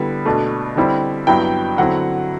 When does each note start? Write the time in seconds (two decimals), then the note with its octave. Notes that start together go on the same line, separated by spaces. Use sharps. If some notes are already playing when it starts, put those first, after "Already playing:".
Already playing: D3 G3 B3 E4
0.26 B2 A3 D4
0.76 D3 G3 C4 E4
1.27 G2 F#3 B3 E4 G5
1.78 D3 F#3 C4 E4 F#5